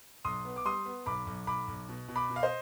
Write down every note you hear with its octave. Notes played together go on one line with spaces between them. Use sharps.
B1 C6 D#6
B3
D6
G3 C6 D#6
B3
B1 B5 D6
B1
B1 B5 D6
B1
B2
B2
B5 D6
B2
F5
C5 D#5